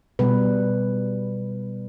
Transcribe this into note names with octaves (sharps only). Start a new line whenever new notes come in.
B2 G3 B4